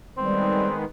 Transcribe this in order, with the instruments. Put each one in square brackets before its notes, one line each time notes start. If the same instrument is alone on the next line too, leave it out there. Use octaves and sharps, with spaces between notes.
[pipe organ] D#3 G#3 B3 [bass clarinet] G3 [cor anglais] C4